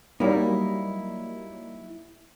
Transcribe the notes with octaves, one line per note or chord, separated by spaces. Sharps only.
F#3 G3 A#3 D#4 E4